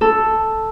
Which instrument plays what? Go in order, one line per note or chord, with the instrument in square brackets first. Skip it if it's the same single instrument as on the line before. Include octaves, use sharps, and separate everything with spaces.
[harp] A4